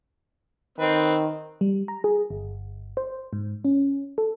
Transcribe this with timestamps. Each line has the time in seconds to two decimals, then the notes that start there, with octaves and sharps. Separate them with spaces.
0.78 D#3 C4 B4
1.61 G3
1.88 A#5
2.04 G#4
2.30 G1
2.97 C5
3.33 G#2
3.65 C#4
4.18 A4